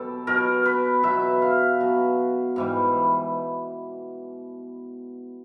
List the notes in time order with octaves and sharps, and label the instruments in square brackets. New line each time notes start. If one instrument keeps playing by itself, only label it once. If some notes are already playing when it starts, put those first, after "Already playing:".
Already playing: [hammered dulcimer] B2 F#3 G4 A4
B2 F#3 A#4
B4
B2 F#3 E5
F5
B2 F#3
G#2 E3 G3